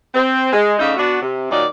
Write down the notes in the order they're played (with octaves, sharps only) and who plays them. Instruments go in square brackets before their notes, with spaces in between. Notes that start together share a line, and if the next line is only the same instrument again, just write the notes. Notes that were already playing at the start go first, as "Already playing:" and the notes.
[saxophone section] C4
G#3
C#3 A3 D#4 D5 E5
B3 D4 F#4
C3
A#2 D#3 F#3 D#4 D5